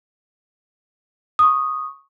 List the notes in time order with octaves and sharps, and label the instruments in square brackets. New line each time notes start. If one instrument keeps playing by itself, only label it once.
[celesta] C#6 D#6